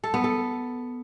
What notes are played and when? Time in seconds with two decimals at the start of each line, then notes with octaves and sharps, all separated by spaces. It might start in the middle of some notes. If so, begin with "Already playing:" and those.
0.04 A4
0.14 B3
0.24 A4